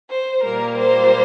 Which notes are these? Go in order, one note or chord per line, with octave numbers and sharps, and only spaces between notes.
C5
A#2 G3 A#3 A#4
C5